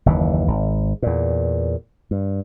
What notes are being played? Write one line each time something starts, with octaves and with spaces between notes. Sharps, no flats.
F#1 D#2 E3
G#1
E2 A#2
G2